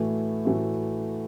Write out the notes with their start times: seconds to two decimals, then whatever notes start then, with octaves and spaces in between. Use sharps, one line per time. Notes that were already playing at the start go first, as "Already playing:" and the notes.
Already playing: A2 E3 A3 F#4
0.45 A2 E3 A3 F#4